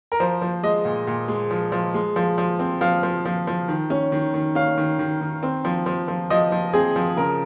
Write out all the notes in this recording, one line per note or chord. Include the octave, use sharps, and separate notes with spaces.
A#4
F3 C5
F3
G#3 D#5
A#2
A#2
G#3
F3
F3
G#3
F3
F3
C4
F3 F5
F3
F3
F3
D#3
C#4
D#3
D#3
C#4 F5
D#3
D#3
D#3
C4
F3
F3
F3
F3 D#5
F3
C4 G#4
F3
C#3 A#4